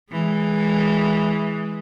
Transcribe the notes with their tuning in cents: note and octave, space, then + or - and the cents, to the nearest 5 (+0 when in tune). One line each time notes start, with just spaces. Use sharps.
E3 -10 G#3 +0